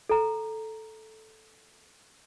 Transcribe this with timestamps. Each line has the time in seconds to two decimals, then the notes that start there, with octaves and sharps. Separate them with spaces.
0.10 A4 A#5